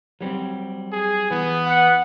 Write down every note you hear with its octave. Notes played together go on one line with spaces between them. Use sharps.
F#3 G3 C4
G#4
E3 B3
F#5